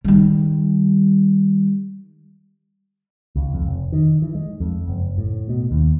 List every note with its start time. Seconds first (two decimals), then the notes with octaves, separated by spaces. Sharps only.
0.05 D#3 G3
3.36 C#2
3.54 F2
3.67 F1
3.93 D#3
4.22 E3
4.35 G#3
4.60 F2
4.88 F#1
5.18 A2
5.49 B2
5.71 D#2